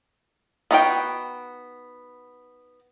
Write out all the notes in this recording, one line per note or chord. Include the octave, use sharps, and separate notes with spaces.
B3 D#4 F#4 A#4 G5